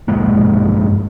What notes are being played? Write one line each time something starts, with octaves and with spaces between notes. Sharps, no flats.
A#1 G2 G#3 A#3